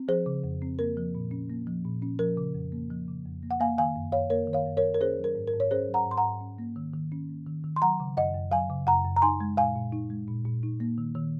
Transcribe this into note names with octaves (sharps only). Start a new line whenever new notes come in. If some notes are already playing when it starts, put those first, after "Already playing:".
Already playing: C4
F3 G#4 C5
C#3
F2
C4
A#3 A#4
F3
A#2
C#4
A#3
F3
A#2
C#4
F3 A#4
C#3
F2
A#3
F3
C#3
F2
A#3
F#5
A#3 F5 G#5
D#3 F5 G#5
F#2
F#2 C#5 F5
A#3 A#4 C#5
D#3
C#5 F5
F#2
A#4 C#5
F#2
A#4
C#4 G#4 C5
F#3
A#4
G#2
A#4
G#2
C#5
C#4 G#4 C5
F#3
F#5 A#5
G#2
C6
F#5 A#5
G#2
C#4
A#3
D#3
D#3
C#4
A#3
D#3
D#3
C6
F#3 F#5 A#5
C#3
F#2 D#5 F#5
F#2
F#3 F5 G#5
C#3
F#2 F#5 A#5
F#2
A#5
D#4 G#5 C6
G#3
A#2 F5 G#5
A#2
D#4
G#3
A#2
A#2
D#4
A#3
D#3
D#3